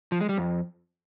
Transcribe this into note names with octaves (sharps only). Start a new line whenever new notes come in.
F3
G#3
G3
F2